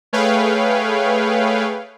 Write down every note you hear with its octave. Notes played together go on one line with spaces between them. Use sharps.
A3 G#4 B4 C#5 F5 G5